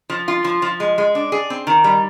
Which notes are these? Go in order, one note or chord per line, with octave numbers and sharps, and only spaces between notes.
F3
F4
F3
F3
G#3
G#3
D4
G#4
C4
D#3
G3